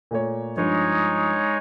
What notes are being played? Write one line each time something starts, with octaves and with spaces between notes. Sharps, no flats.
A#2 A3 C#5
G2 F3 G#3 D#4 C#5